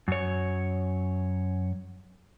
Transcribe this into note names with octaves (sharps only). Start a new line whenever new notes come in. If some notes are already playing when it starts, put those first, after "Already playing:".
F#2 C#5